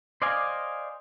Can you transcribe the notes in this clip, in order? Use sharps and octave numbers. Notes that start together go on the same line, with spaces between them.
C5 D5 D#5 F5 G#5